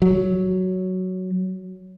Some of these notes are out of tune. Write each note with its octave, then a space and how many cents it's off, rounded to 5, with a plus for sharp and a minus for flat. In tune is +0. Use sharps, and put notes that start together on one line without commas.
F#3 +5